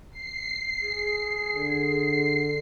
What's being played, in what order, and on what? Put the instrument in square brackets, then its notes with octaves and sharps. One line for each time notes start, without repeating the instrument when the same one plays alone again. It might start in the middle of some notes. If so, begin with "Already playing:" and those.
[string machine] C7
[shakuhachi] G#4
[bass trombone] D3